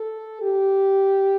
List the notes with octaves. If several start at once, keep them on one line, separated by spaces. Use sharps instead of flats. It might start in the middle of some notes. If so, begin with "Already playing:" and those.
Already playing: A4
G4